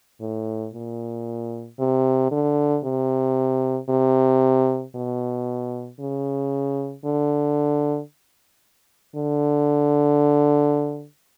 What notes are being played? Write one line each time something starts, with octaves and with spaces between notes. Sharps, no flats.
A2
A#2
C3
D3
C3
C3
B2
C#3
D3
D3